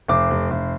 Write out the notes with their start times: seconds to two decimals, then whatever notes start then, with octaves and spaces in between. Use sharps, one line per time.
0.08 F1 D6
0.30 F1
0.50 F1